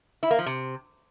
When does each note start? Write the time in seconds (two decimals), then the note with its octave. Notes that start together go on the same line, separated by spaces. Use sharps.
0.23 E4
0.31 A#3
0.38 F3
0.46 C3